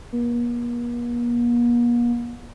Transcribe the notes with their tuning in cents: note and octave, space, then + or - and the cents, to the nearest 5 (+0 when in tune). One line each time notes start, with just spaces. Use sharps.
A#3 +45